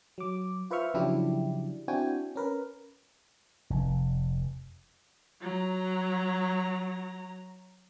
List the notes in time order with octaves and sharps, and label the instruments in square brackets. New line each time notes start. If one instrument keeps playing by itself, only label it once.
[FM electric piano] F#3 D6
F4 B4 C5 E5 C#6 F6
C#3 F3 F#3 D4 E4 G4
C4 D4 E4 F#4 G5 G#5
C#4 A#4 B4
[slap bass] F1
[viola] F#3 A#5